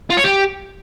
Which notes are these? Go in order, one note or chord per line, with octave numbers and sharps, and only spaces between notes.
F4
C#5
G4